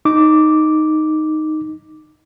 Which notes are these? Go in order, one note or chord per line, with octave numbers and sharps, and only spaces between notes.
D#4 D6